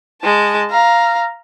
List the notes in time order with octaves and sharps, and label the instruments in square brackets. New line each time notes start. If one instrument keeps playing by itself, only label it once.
[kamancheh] G#3 A5
F5 A#5